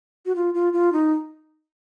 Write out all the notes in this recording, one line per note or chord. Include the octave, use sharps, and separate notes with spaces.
F#4
F4
F4
F4
D#4